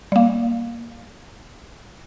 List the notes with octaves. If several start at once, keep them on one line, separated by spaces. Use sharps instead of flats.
G3 A#3